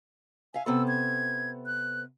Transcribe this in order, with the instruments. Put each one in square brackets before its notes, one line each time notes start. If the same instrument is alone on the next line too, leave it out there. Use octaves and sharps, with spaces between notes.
[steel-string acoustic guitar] E5 F5 [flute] G#5
[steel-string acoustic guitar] C3 B3 A4 [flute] E6
[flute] G#6
F#6